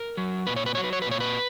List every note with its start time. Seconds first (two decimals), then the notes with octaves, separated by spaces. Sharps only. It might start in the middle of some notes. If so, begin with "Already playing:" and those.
Already playing: A#4
0.17 F#3
0.47 A#2 B4
0.56 C#5
0.66 B4
0.75 F#3 C#5
0.84 B4
0.93 C#5
1.02 B4
1.07 A#2 C#5
1.20 B4